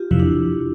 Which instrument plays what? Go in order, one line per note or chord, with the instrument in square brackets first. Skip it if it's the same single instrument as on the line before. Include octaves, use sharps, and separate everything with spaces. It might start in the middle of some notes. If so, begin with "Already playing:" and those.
Already playing: [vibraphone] F4 G4
[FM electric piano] F2 C3 F3 [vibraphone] E4
[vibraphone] D4